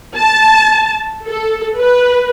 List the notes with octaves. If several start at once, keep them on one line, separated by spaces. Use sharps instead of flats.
A5
A4
B4